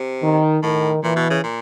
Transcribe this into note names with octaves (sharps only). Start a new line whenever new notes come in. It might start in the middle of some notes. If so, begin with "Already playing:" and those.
Already playing: C3
D#3
A2 D#3
A#2 E3
B2
C#3
A#2